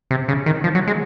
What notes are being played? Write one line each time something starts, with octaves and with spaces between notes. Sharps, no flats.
C3
C#3
D#3
F3
F#3
G#3